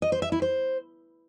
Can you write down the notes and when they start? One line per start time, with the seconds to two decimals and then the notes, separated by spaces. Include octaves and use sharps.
0.02 D#5
0.12 C5
0.22 E5
0.32 E4
0.42 C5